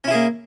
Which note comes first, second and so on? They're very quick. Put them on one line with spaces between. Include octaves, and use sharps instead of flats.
C#4 E4 G#4 A#3